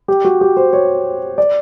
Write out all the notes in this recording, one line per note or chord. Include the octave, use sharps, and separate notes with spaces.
G4
F#4
G4
C5
C#5
D5